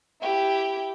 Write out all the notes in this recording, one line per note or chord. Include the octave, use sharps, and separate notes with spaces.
E4 G4